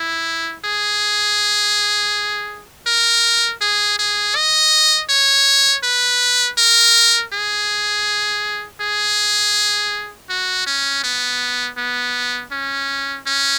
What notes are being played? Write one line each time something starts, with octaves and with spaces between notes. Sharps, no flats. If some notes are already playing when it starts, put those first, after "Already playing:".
Already playing: E4
G#4
A#4
G#4
G#4
D#5
C#5
B4
A#4
G#4
G#4
F#4
C#4
B3
B3
C#4
C#4